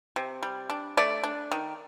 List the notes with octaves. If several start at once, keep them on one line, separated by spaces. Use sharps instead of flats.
C3
G3
D4
A3 D5
D4
D#3